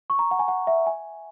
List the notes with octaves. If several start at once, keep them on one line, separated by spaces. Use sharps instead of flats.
C#6
A#5
F#5
G#5
F#5
E5
G#5